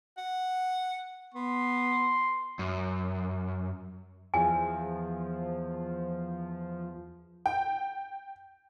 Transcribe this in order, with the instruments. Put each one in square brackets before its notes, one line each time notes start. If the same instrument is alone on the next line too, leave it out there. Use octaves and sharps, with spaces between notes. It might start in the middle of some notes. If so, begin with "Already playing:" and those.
[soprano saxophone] F#5
[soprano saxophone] B3 [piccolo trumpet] C6
[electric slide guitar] F#2
[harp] E2 [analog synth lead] F3 [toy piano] G#5
[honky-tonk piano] G5